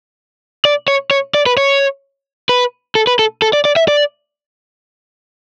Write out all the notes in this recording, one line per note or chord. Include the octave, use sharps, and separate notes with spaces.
D5
C#5
C#5
D5
B4
C#5
B4
A4
B4
A4
A4
D5
D5
E5
D5